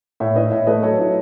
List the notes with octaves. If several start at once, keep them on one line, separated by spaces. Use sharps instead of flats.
A2 C#5 E5
E4 B4 D#5
A2 C#5 E5
A3 B4 D#5
F#3 A4 C#5
E4